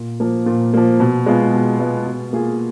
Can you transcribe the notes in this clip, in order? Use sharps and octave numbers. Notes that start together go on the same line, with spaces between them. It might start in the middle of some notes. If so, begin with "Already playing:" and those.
Already playing: A#2
F3 A#3
A#2
F3 A#3
B2
G#3 B3 F4
B2
G#3 B3 F4
B2
A#3 F4 G#4